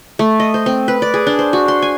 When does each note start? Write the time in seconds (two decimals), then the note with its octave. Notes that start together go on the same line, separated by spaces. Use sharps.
0.19 A3
0.40 D#5
0.54 C5
0.66 C4
0.88 B4
1.02 D5
1.14 G#4
1.27 D4
1.39 C5
1.53 F#4
1.68 C6
1.82 G#5